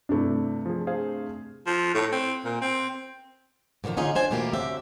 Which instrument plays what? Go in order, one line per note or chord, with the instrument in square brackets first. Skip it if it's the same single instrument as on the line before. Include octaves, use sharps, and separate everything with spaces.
[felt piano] G2 C3 A3 [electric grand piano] D4 E4
[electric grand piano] F3 G#4
G#4 C5 F5
[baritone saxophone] F3
A2
C4
A#2
C4
[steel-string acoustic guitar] G#2 D3 D#3 F3 A#5
D3 C#4 D#4 F4 G#4
D4 C5 G#5
B2 E3 A3 A#3 F4 G4
F#2 D3 C4 G4 E5